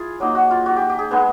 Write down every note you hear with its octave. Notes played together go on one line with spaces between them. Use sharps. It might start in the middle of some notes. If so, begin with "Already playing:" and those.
Already playing: E4 F4 G#4
F#3 A#3 D#4
F#4
F4
F#4
G4
G4
G#4
G#3 B3 D#4 G#4